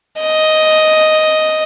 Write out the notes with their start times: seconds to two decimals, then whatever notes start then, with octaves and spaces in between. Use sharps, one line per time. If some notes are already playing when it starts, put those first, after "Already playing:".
0.21 D#5